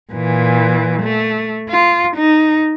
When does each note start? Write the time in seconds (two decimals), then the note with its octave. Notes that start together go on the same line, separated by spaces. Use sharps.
0.13 A#2 E3
1.02 A3
1.69 F4
2.16 D#4